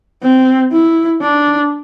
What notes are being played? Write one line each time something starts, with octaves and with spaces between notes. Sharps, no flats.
C4
E4
D4